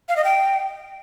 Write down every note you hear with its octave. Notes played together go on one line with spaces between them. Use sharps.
F5
D#5
G5